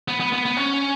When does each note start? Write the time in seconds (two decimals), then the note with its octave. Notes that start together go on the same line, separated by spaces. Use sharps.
0.08 B3
0.20 B3
0.33 B3
0.45 B3
0.57 C#4